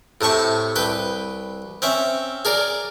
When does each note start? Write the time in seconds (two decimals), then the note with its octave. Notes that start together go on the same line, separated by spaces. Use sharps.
0.21 A2 C3 A5 C#6
0.76 C2 B4 G5
1.82 C4 C#4 E5
2.45 G#4 A#4 D5